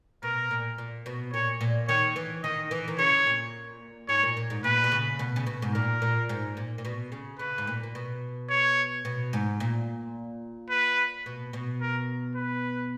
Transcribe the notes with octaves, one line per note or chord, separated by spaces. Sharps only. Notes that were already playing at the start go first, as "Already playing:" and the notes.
B2 A#4
A#2
A#2
B2
A#2 C#5
A#2
D#3 C#5
E3
D#3 D#5
E3
D#3
C#3 C#5
A#2
G#2 C#5
A#2
A#2
G#2
A#2 B4
B2
C#3
B2
C#3
B2
G#2
A#2 A#4
A#2
G#2
A#2
A#2
B2
C#3
C#3 B4
G#2
A#2
A#2
B2
C#5
B2
G#2
A#2
B4
B2
B2
A#4
B4